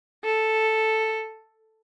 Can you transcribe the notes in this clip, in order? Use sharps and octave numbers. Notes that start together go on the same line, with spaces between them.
A4